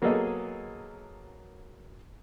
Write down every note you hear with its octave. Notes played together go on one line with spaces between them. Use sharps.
F#3 A#3 B3 G#4 A4 D#5